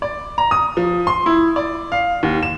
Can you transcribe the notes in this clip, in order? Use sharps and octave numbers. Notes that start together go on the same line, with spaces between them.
D5
A#5
D#6
F3
C6
E4
D5
F5
D#2
E7